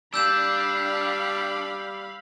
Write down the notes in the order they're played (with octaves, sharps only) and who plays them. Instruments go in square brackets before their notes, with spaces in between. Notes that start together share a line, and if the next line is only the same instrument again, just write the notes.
[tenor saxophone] G3 [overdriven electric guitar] D4 [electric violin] F5 B5 [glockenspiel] E6 G6 E7